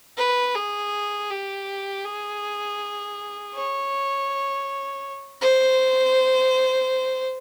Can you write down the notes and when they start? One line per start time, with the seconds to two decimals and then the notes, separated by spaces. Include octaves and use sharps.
0.18 B4
0.55 G#4
1.30 G4
2.05 G#4
3.54 C#5
5.41 C5